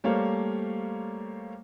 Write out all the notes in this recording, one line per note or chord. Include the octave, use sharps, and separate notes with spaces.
G3 A3 A#3 C5 C#5 F5